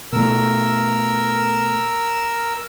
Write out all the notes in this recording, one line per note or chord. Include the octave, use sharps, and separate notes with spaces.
B2 A3 A#4 E6